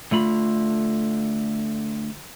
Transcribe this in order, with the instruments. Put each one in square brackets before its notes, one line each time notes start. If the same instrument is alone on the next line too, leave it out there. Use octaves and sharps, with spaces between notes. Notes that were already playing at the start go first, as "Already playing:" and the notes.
[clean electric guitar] D3 A3 F4 B5